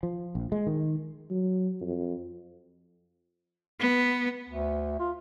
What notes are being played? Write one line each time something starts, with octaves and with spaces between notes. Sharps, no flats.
F3
A#1
G#3
D#3
F#3
F2
B3
D2
F4